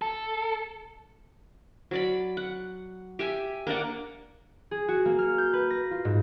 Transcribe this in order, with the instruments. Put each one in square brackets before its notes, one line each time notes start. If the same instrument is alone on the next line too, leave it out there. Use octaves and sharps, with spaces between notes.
[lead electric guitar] A4
[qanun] F#3 D5 B5
F#5
G4 E5 G#5
A#3 D4 D5 F#5
[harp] G#4
F#4
A#3
F6
G6
B4
A#6
F4
G#2